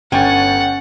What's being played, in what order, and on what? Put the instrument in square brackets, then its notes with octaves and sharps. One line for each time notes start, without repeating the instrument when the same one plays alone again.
[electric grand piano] G1 A6 [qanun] C#4 [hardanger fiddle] F#5 [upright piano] G5